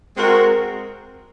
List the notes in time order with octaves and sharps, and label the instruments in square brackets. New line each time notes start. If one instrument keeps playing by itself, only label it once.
[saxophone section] G#3 C4 F#4 A#4